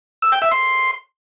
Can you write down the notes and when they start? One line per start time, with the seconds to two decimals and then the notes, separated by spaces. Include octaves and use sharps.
0.22 E6
0.32 G5
0.42 E5
0.52 C6